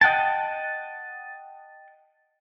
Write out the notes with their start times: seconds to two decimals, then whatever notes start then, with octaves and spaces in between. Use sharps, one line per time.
0.01 D#5 F#5 G5 A5